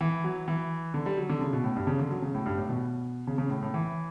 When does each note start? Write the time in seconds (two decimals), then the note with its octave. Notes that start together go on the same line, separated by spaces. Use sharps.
0.01 E3
0.24 F#3
0.48 E3
0.94 D3
1.06 G3
1.17 F#3
1.30 D3
1.41 C#3
1.53 B2
1.64 A2
1.76 G2
1.87 C#3
1.99 D3
2.11 F#3
2.22 C#3
2.35 A2
2.46 G2
2.58 A2
2.69 B2
3.27 C#3
3.38 C#3
3.50 A2
3.62 A2
3.74 E3